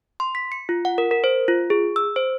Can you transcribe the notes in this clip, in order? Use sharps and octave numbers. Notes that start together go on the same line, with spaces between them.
C6
B6
C#7
F4
F#5
A#4
A#4
C5
F4
G#4
E6
C5